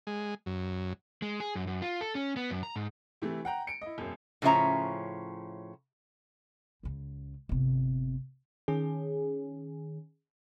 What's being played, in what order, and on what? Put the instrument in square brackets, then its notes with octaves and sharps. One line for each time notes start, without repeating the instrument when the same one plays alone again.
[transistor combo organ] G#3
F#2
[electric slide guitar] G#3
G#4
F#2
F#2
F4
A4
C#4
B3
F#2
A#5
G#2
[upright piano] C3 E3 A3
F#5 G5 A#5
C#7 D7
E4 D#5
E1 F#2
[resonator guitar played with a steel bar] A2 C#3 F3 C#4 E5 A#5
[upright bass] C#2 C#3
G1 C3
[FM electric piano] D#3 C#4 G#4